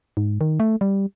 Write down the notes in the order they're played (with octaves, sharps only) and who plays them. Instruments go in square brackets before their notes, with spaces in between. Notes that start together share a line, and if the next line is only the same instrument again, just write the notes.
[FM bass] G#2
D#3
A3
G3